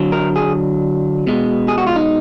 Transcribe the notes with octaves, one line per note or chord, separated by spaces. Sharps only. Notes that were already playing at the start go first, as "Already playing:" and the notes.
Already playing: D3 F#3
A#4
G#4
B2 G#3
G#4
F#4
F4
D#4